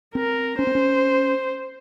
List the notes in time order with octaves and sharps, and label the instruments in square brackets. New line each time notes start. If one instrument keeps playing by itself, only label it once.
[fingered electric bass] C4 [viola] A#4
[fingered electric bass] C#4 [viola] C5
[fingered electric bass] C4
C#4